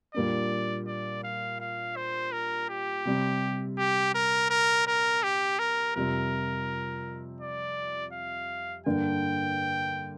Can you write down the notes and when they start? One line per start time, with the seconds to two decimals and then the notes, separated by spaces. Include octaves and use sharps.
0.14 A#2 G3 A#3 D4 D5
0.87 D5
1.24 F5
1.60 F5
1.96 C5
2.32 A#4
2.69 G4
3.05 C3 G3 C4
3.78 G4
4.14 A#4
4.50 A#4
4.87 A#4
5.23 G4
5.59 A#4
5.96 F2 C3 G3 A#4
7.41 D5
8.13 F5
8.86 G2 D3 A#3 D4 G5